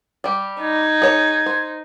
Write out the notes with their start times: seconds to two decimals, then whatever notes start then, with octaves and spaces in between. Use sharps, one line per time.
0.24 G3 G4
0.61 D#4 G#6
1.02 G#4 C#5
1.46 C5